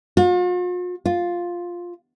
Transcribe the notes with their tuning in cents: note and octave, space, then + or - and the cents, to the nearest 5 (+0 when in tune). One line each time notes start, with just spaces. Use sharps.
F4 +45
F4 +5